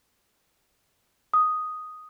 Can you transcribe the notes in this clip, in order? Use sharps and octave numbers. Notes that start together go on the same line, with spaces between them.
D#6